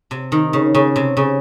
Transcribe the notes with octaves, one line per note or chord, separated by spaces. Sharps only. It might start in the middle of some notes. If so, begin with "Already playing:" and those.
C3
D#3
C#3
C#3
C3
C#3